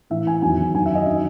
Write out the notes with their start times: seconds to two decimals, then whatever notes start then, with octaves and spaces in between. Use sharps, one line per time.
0.10 A2 E3 E5
0.27 G#5
0.42 E2 D#3 F#3 G#5
0.74 F#2 D#3 F#3 G#5
0.86 E5
0.95 D#5
1.06 D#3 F#3 E5